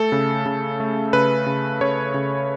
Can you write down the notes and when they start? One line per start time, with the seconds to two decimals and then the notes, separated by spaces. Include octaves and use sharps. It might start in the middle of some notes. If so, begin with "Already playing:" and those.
Already playing: A3 A4
0.12 C#3
0.46 C#3
0.80 A3
1.13 C#3 B4
1.47 C#3
1.81 C#3 C#5
2.14 C#3